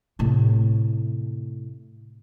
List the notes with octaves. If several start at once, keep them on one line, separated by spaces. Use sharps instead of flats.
A2 C3